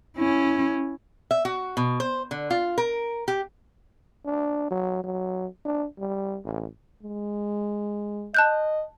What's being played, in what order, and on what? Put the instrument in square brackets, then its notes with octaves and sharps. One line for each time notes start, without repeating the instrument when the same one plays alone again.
[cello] C#4 E4
[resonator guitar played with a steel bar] E5
F#4
B2
C5
D3
F4
A#4
G4
[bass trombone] D4
F#3
F#3
D4
G3
A1
[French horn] G#3
[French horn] D#5 [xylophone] A5 F#6 G6